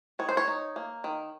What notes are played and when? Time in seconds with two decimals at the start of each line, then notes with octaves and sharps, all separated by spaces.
0.19 D#3 C#5
0.29 C5
0.37 C#5
0.48 D#4
0.76 A#3
1.04 D#3